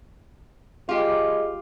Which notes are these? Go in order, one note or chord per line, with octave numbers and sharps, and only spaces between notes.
G#3 F4 G4